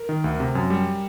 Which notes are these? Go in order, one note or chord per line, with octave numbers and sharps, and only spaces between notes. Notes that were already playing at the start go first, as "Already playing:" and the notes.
Already playing: A#4
D#3
D2
C3
F#2
G3